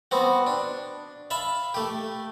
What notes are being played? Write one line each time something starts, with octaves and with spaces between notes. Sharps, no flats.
B3 C4 F#4
D4
E5 F5 A5 B5
A3 G4